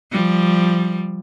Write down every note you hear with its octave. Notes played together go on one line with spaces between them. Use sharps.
F3 G3